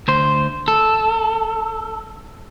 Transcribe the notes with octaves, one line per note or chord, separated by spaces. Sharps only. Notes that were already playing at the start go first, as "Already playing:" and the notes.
D2 C5
A4